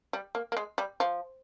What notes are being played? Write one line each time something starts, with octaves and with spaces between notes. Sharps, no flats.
G3
A#3
A#3
G#3
G3
F3